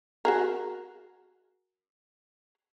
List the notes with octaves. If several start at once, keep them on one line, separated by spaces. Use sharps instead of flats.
F#4 G#4 A#4